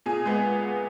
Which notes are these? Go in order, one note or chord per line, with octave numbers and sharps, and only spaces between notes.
A#2 G#4
G#3 B3